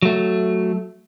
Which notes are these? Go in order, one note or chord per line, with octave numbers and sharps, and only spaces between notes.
F#3 A3